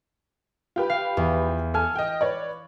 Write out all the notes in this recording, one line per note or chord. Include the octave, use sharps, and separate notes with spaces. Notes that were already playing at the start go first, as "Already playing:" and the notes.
F4 G4 B4
F5
E2
A4 G#5 F6
D#5 G5
B4 C#5 D5